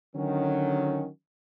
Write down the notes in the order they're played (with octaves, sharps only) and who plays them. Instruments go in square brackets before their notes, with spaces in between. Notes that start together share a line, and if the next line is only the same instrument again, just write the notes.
[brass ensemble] D3 D#3 F#3 C#4